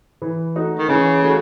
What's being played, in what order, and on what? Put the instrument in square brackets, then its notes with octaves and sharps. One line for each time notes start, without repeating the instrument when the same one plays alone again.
[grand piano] E3
A3 D#4 F#4
[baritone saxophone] D#3
[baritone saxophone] C#3 [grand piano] E3
[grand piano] A3 D#4 F#4